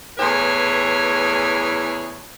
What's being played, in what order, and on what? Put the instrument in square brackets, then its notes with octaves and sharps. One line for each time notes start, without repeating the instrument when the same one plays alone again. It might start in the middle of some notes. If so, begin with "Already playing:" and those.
[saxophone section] E2 A2 G#4 B4 C#5